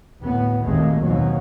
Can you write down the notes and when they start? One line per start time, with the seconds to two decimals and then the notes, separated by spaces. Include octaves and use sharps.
0.21 D2 A2 B3
0.63 G#1 D#2 A#2 G#3 A3
1.03 D#2 B2 F3 F#3